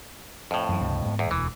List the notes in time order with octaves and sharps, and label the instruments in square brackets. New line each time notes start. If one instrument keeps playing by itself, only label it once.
[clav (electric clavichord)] F2 A2
[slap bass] F#2 E3
C#2 G2 C3
G#2 B3
[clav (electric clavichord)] E2
[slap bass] E1 D2 [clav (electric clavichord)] E3